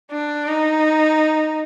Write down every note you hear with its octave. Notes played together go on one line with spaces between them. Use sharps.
D4
D#4